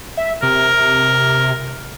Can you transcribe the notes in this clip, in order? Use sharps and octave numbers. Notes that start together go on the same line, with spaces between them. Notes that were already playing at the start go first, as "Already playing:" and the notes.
E5
C3 A#4